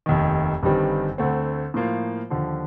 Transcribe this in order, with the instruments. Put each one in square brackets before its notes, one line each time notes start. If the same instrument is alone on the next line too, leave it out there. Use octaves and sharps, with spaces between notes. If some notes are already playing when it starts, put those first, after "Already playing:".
[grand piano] F1 D#2 D#3
G1 G2 D#3 G3 C4
D2 D3 A3 C4
A2 F3 A#3 F4 C5
D#2 D3 F3